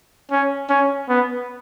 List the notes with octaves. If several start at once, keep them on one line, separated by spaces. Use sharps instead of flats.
C#4
C#4
B3